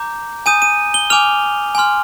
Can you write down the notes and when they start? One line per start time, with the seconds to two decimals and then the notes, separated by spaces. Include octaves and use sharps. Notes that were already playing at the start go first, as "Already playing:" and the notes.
Already playing: A#5 D6 G6
0.46 G#5 D#6 G6 D#7
0.62 D#7
0.94 G7
1.10 G#5 D6 F6 F7
1.75 G#5 C6 F6